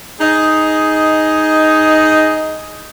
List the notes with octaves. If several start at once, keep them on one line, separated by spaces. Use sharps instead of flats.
D#4 G#4 D#5